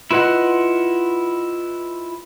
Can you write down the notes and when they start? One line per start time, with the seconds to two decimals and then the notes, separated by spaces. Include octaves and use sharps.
0.11 E4 F4 B4 D#5 F#5